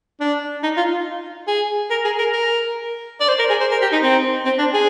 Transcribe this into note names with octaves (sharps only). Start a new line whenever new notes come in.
D4
D#4
F4
G#4
A#4
G#4
A#4
A#4
D5
C5
A#4
G#4
C5
A#4
G4
D#4
C4
C4
D4
G#4